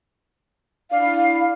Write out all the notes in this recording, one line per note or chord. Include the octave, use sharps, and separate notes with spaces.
D4 E4 F5